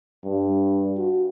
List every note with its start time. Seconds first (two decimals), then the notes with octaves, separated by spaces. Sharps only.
0.24 G2
0.97 F#4